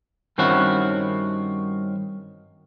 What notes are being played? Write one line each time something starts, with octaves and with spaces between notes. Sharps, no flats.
G2 D#3 C4 C#4 E4 F#4